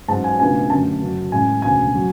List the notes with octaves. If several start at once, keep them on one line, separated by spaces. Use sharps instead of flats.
G#2 F#3 C#4 A5
G#5
C#2 B2 A3 D4 G#5
F#2 D3 A3 C#4 A5
F#2 C#3 F#3
A1 A2 G#3 G#5
E1 D2 C#3 G#5
F#3